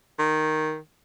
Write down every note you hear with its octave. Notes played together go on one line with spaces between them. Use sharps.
D#3